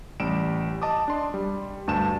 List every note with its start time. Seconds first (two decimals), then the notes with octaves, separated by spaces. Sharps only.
0.20 A1 G3 G4 D7 E7
0.82 D#5 A5 D6 D#6
1.08 D4 C6
1.34 G3
1.87 D2 G2 A5 E7